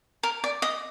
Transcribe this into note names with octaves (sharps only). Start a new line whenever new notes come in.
A#4
D5
D#5